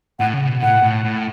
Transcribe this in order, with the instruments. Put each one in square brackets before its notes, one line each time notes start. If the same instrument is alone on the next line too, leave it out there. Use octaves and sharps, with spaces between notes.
[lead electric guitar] A2 [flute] F#5
[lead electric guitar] C#3
B2
[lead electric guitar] A2 [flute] F#5
[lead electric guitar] A2
A2